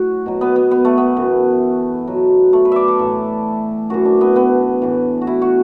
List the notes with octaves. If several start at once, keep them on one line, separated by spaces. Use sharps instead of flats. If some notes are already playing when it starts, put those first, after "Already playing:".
Already playing: A2 F#3 F#4
B2 F#3
B3
B3
B3
A3
B3
F#2 E3
B2 F#3
A3
B4
D5 E5
A4
A2 E3
F#2 E3 F#4
D4
B3
B3
A2 E3
F#4
E4
F#4